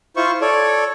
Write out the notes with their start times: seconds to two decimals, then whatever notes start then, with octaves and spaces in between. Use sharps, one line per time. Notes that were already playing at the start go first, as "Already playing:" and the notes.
0.16 E4 F4 C5 C#6
0.41 A4 C#5 D5